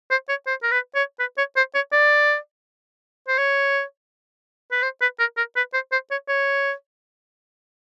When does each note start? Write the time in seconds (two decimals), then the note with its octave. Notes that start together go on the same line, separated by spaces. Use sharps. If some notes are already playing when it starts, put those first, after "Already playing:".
0.10 C5
0.29 C#5
0.47 C5
0.63 A#4
0.71 B4
0.95 C#5
1.19 B4
1.38 C#5
1.56 C5
1.75 C#5
1.92 D5
3.28 C5
3.38 C#5
4.72 B4
4.83 C5
5.01 B4
5.19 A#4
5.37 A#4
5.56 B4
5.73 C5
5.92 C5
6.11 C#5
6.28 C#5